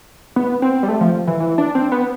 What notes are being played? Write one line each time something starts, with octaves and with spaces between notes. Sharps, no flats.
B3
C4
G3
A3
F3
E3
E3
D4
C4
B3